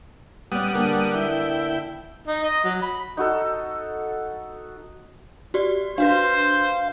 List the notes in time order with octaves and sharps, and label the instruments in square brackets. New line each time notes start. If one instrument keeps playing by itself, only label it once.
[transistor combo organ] G3 F#5 D#6 [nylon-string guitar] B3 C#4
[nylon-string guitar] D3 A#3 B3
[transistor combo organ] E4 G5
[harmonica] D#4
D#5
F#3
B5
[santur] D#4 F#4 A4
[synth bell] F#4 G4 D5
[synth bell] D4 F#4 B4 [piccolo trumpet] C5 [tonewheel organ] F5